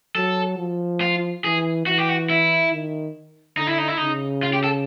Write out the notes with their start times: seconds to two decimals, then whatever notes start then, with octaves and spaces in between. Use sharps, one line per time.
0.15 F#3 A4
0.58 F3
1.01 F4
1.44 E3 G#4
1.86 E3 F#4
1.98 G4
2.09 F#4
2.30 E4
2.73 D#3
3.57 D3 D#4
3.67 E4
3.78 D#4
3.88 E4
3.98 C#3 D#4
4.43 F4
4.53 G4
4.64 A4